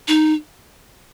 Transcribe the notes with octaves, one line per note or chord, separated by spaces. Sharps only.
D#4